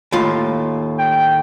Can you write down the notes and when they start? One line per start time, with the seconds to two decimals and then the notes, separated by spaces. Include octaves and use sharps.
0.12 D#2 A2 F4
0.99 G5